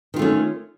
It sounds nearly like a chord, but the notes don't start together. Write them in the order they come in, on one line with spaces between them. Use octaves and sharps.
D#3 F4 A3 C#4